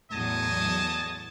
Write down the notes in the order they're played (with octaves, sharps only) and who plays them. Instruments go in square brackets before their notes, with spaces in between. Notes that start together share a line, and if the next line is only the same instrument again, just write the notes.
[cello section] E2 A2 F#3 [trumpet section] D#5 G#5 A5